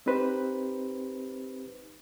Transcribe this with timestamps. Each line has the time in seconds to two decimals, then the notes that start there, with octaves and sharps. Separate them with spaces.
0.06 C4 D#4 G4 B4 C5